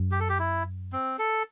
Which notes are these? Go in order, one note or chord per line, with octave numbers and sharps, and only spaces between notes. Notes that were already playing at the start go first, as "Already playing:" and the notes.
Already playing: F#2
G4
A4
G4
E4
C4
A4